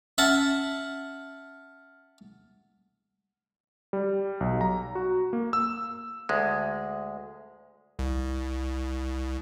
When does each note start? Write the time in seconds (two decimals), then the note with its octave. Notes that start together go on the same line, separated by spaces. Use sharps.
0.18 C#4 E5 F#5 A5 F6 F#7
3.93 G3
4.41 B1
4.61 A#5
4.95 F#4
5.33 A#3
5.53 E6
6.29 D2 G#3
7.99 C2